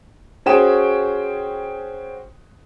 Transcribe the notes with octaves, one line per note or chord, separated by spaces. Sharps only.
C#4 F#4 G#4 C5 G5 E7